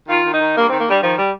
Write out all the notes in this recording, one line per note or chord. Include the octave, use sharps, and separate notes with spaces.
D#3 F4
D#3
D#4
D#3
G2 A#3
D#3 C4
A#3
G2 G3
D#3 F3
G3